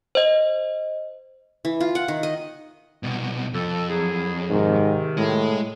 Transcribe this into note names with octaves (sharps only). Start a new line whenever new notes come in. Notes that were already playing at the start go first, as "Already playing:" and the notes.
C5 D#5
E3
F4
F#5
D#3
D#5
C2 B2
F2 A4
F#3 E4 G#4
G#2 C3 D#3
A2 G#3